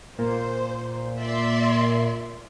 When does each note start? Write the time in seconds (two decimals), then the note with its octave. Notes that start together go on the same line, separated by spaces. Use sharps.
0.19 A#2 C5
1.21 D5 E5 C6